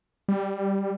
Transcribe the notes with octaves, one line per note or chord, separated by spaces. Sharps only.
G3